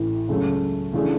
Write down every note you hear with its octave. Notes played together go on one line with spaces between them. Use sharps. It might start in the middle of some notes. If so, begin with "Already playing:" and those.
Already playing: A1 A2 E3
C#2 C#3 F#3 A3
C#3 E3 A3 D4 G#4